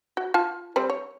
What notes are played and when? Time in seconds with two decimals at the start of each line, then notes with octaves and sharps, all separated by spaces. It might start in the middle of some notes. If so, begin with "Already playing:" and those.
0.17 F#4
0.34 F4 A5
0.76 G3 C4 C5
0.90 C#5